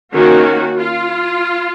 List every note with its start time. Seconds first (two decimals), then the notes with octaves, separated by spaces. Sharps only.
0.14 D#3 A#3 C#4 F#4
0.79 F4